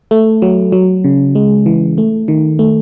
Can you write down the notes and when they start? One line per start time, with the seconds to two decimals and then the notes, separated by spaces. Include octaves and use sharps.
0.11 A3
0.42 F#3
0.72 F#3
1.04 C#3
1.35 G#3
1.66 E3
1.98 A3
2.28 D#3
2.59 A3